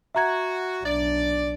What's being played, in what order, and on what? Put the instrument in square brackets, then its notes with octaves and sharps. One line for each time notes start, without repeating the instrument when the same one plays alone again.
[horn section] F#4 [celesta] E5 A#5 G#6
[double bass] B1 D4 [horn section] D5